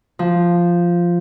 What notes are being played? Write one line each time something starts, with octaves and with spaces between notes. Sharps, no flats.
F3